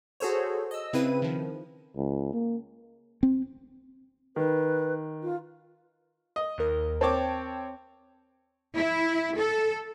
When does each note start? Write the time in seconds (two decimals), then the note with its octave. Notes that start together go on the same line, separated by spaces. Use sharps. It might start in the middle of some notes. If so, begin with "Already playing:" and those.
0.20 F#4 G#4 A4 C5 C#5
0.71 D#5 E6
0.93 C#3 C4 E4 B4 D#7
1.22 D#3 F3
1.97 C#2
2.33 A#3
3.23 C4
4.36 D#3 B4
5.22 F4
6.36 D#5
6.58 D#2 A#4
7.01 C4 C#5 G5 A5 D6
8.76 E4
9.38 A4